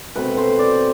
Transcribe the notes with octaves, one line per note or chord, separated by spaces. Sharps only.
B2 A3 C4 B4
C5
D5